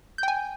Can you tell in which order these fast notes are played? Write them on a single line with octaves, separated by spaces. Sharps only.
G6 G5 G#5